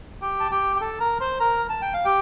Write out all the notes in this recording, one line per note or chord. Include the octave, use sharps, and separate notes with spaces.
G4 G5
A5
G4 G5
G5
A4 A5
A#4 A#5
C5 C6
A#4 A#5
A5
G5
F5
G4 G5